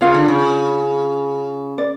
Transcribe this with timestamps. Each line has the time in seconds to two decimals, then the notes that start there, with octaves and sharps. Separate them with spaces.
0.01 C#3 F4 F5
0.14 D3
0.28 C#3
1.78 D5